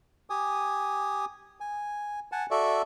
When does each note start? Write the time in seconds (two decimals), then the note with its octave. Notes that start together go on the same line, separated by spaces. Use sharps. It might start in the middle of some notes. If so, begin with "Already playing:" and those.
0.30 G4 G#5 D#6
1.60 G#5
2.32 F#5 G#5 A5
2.51 F#4 A4 D5 E5